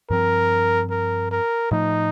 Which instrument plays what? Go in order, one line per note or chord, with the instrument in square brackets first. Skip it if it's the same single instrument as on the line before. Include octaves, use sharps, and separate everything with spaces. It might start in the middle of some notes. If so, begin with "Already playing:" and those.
[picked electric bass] G2 F3 C4 [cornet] A#4
[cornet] A#4
A#4
[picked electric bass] A2 F3 A3 [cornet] D#4